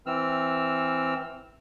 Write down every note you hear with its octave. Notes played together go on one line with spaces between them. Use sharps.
E3 C4 E6 F6